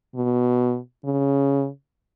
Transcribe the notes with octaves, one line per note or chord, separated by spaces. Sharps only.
B2
C#3